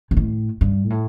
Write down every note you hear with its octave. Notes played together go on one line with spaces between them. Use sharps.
G2
A2
G2
A2